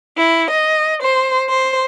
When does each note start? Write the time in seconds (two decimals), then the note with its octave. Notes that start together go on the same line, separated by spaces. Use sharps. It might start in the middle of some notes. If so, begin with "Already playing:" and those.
0.16 E4
0.50 D#5
1.02 C5
1.49 C5